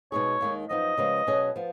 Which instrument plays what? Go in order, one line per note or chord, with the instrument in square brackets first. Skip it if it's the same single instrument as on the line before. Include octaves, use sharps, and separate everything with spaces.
[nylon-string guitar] B2 G#3 D#4 G#4 [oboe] C#5
[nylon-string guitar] D#2 D#3 G#3 D#4
[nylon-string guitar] F#2 F3 B3 D#4 [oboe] D#5
[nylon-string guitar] C#3 F3 G#3 B3
B2 F#3 C#4 G#4
F3 B3